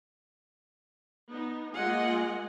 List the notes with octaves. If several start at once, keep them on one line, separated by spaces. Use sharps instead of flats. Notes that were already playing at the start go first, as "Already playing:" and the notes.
B3 D#4
G#3 A#3 F4 D#5 F#5 G#5